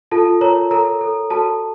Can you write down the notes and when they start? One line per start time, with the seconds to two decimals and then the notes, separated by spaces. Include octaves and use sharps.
0.11 F4 A4 A5
0.41 A#4 C#5 A#5
0.71 A4 A#4 A#5
1.01 A4
1.30 F#4 A4 A5